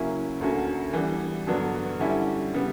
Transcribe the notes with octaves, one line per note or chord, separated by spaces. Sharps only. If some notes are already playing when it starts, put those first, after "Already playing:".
Already playing: C#3 F#3 A#3 C#4 E4
D2 D3 A#3 C#4 F#4
E3 G3 B3 D4
G2 D3 F#3 B3 D4
D3 G3 C#4 E4
C#3 G3 B3